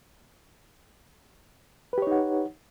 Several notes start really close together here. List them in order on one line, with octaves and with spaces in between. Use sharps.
B4 G4 C#5 D#4 F#5